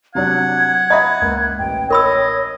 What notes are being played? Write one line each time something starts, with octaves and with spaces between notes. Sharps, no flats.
C3 F#3 D4 F#5 G#6
D#5 E5 A#5 B5 D#6
C#2 A#3
A1 G5
A#4 C#5 D#5 B5 E6